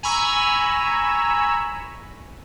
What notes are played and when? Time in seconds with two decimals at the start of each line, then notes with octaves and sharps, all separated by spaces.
0.03 G#5 A#5 B5 C#6 E6